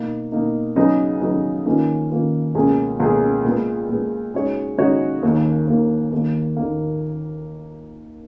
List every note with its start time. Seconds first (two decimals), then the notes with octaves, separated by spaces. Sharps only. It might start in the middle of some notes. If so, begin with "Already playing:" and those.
Already playing: B2 A#3 D#4
0.32 B2 A#3 D#4
0.76 C#3 F#3 B3 D#4 G#4
1.21 C#3 F#3 B3 D#4 G#4
1.66 D#3 A#3 C#4 F4 B4
2.10 D#3 A#3 C#4 F4 B4
2.55 C#2 B2 A#3 C#4 G#4
3.00 C#2 B2 A#3 C#4 G#4
3.45 A#2 G#3 B3
3.89 A#2 G#3 B3
4.34 C#3 G#3 D#4 F#4 C#5
4.78 C#3 G#3 D#4 F#4 C#5
5.23 D#2 D#3 A#3
5.68 D#2 D#3 A#3
6.12 D#2 D#3 A#3
6.57 D#2 D#3 A#3